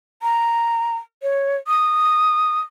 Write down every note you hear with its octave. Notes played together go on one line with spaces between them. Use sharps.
A#5
C#5
D#6